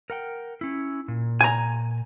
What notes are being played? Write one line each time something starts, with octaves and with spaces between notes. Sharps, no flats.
A#4 F#5 G5
C#4 E4
A#2
G#5 A#5